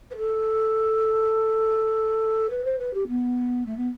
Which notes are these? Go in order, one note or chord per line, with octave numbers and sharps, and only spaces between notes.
B4
A4
B4
C5
B4
G4
B3
A3
B3